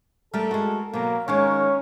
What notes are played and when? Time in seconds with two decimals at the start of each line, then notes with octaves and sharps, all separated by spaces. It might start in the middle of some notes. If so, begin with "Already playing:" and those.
0.34 G3 A3 A4 A#4
0.51 G#3 F#4
0.93 B2 F#3 A#3
1.28 D#3 G#3 A#3 C#4 C#5